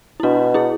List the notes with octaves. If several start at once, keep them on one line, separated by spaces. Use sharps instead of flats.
E4
B2 D4 F#4
E4 G#4